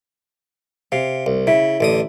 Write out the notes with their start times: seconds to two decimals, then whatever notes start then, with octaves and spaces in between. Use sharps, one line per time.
0.92 C3 F5
1.26 C2
1.47 C#3 E4
1.81 A1 D3 D#6